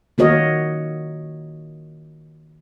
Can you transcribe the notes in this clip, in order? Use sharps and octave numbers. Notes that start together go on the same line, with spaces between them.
D#3 A#3 F#4 A#4 C#5 D#5